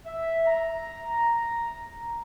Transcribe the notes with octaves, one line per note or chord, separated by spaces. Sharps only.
E5
A#5